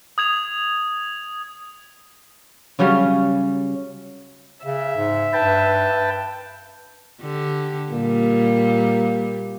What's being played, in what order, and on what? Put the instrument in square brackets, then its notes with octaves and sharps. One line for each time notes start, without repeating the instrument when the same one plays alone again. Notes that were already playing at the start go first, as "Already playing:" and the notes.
[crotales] D#6 G#6 F7
[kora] C#3 F#3 G3 C#4
[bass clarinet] C#3 [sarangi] E5
[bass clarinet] G#2
[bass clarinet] G2 [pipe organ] B4 G5 A5
[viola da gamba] D3 G4
[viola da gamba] A#2 G3 [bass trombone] A#3